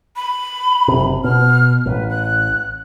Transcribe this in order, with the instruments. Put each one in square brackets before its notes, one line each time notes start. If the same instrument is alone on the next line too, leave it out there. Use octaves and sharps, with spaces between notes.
[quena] B5
[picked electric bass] F#1 C3
[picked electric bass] B2 [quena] F6
[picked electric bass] A1 [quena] B4
[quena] F#6